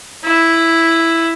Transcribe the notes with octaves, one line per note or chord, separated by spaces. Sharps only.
E4